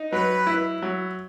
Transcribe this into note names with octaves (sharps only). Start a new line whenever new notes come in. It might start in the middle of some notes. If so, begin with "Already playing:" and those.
Already playing: D#4
F#3 B4
E4
F#3